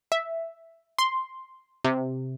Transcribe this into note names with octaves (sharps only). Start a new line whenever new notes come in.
E5
C6
C3